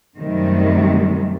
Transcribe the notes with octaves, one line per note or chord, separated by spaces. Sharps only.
F#2 C3 D#3 G3 A3